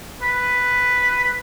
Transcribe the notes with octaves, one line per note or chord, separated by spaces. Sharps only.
B4